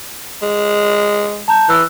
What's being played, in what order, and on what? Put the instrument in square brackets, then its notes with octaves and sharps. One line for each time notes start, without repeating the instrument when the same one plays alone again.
[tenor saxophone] G#3
[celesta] A5 A#5 G6
[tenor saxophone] E3 [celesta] E6 F#6